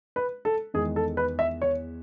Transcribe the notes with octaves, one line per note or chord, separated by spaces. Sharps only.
B4
A4
E2 D#3 G#3 G#4
A4
B4
E5
C#5